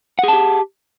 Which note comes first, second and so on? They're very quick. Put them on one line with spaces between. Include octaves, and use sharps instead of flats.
F#5 G#4 A5 G4